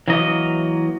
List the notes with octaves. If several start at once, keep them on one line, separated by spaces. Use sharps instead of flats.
E3 F#3 A#3 D#5